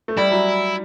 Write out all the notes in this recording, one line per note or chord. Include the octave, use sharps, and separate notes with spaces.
A3
G3 E4
F#3